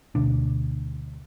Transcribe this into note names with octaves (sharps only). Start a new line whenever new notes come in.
D2 B2 D4